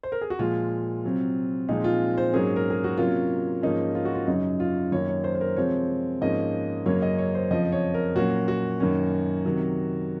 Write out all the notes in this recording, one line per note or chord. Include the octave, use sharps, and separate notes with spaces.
C5
A#4
G#4
F#4
A#2 F3 G#3 F4
C3 F#3 C4
A#2 F3 G#3 C4 D#4
F4
C5
G#2 F#3 A#3 C#4 G#4
A#4
G#4
F#4
C3 F#3 A#3 C#4 F4
G#2 F3 A#3 C#4 D#4
F4
F#4
F4
F#2 C#3 F#3 C#4 D#4
F4
F#2 D#3 A#3 C#5
C#5
C5
C5
A#4
C3 F3 G#3 C4 C#5
G#2 F3 A#3 C#4 D#5
F#2 C#3 F#3 A#3 C#4 C#5
D#5
C#5
C5
F2 C#3 F3 D#5
C#5
A#4
A#2 F#3 A#3 C#4 F#4
F#4
F#2 D#3 A#3 C#4
C3 D#3 F#3